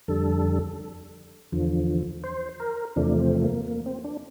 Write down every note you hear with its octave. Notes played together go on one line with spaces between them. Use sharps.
F2 D3 G3 A4
E2 D3 F3
C5
A#4
E2 C3 F3 A3 D4
C4
A#3
A#3
C4
D4